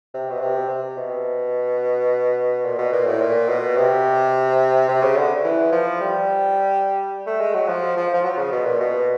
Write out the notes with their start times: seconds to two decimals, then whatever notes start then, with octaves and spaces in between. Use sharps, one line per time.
0.14 C3
0.30 B2
0.41 C3
0.69 C3
0.97 B2
2.65 A#2
2.78 B2
2.93 A#2
3.07 A2
3.21 A#2
3.49 B2
3.77 C3
4.89 C3
5.03 C#3
5.16 D3
5.44 E3
5.72 F3
6.01 G3
7.26 A3
7.40 G#3
7.54 F#3
7.68 F3
7.97 F3
8.14 F3
8.24 F#3
8.38 C#3
8.52 B2
8.66 A#2
8.80 B2